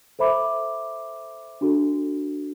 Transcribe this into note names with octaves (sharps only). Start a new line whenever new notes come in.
A4 C5 E5 B5 D6
D4 F#4 A4